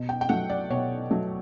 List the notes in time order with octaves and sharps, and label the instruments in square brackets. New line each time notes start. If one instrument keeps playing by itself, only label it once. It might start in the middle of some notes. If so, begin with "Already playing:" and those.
Already playing: [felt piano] B2
G5
G5
F#3 A3 F#5
D5
B2 C#5
F#3 A3